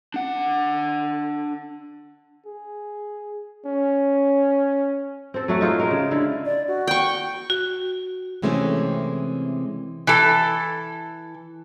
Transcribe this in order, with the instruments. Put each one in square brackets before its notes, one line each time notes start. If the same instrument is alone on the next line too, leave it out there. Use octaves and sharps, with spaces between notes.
[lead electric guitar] D4 F#5
[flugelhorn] G#4
C#4
[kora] C4 A4
F#3 A3 F#5
D#4 F4 G#4 A4
G#3 A#4
C#3
D3 E4
[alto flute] D5
F#4
[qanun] G5 C#6
[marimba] F#4
[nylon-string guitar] C3 E3 G#3 A3 C4 C#4
[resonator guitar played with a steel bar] E3 A4